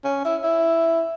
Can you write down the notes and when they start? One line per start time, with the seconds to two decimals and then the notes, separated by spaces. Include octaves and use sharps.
0.04 C#4
0.25 E4
0.44 E4